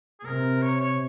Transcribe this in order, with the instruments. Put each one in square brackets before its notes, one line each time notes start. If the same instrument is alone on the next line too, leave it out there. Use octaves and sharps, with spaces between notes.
[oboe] G#4
[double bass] C3 [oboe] A#4
[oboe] C#5
C#5